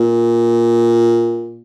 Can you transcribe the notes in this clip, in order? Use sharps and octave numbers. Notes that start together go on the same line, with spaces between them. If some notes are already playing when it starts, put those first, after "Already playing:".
Already playing: A#2